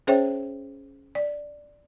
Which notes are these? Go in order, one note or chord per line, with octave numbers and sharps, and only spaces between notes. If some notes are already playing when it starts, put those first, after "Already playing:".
C#4 G#4 C5 C#5 E5 G5
D5